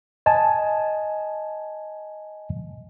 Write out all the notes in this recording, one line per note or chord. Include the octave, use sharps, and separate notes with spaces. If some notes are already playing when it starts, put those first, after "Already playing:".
D#5 G#5 A5